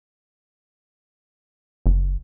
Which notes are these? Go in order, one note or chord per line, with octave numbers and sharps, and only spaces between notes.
F#1